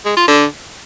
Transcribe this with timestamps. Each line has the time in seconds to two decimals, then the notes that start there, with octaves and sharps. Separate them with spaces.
0.05 G#3
0.17 F4
0.28 D3